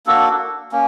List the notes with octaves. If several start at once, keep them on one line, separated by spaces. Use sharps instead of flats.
A#3 D4 F#4 A4
A#3 C#4